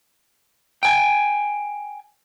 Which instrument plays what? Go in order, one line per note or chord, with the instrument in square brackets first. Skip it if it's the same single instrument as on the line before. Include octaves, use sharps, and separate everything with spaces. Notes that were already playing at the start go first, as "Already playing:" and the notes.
[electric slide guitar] G5 G#5